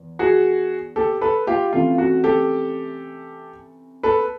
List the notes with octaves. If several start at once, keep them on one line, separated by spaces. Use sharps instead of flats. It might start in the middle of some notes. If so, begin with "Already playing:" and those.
Already playing: E2
F#4 G#4
G4 A4
A4 B4
F4 G4
C3 E3 A3 C#4 F4
F#4
G4 A4
A4 B4